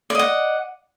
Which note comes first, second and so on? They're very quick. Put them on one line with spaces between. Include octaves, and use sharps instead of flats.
D5 D#5 F#5